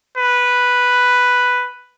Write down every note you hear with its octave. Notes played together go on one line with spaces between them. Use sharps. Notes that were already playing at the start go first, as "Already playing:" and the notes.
B4